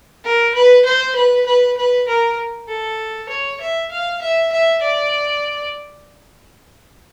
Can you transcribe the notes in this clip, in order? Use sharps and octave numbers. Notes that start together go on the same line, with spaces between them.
A#4
B4
C5
B4
B4
B4
A#4
A4
C#5
E5
F5
E5
E5
D5